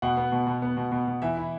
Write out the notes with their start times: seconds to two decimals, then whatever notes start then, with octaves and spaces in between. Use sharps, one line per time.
0.02 B2 F#5
0.17 B3
0.32 B2
0.47 B2
0.62 B3
0.77 B2
0.91 B2
1.07 B2
1.22 E3 E5
1.37 E4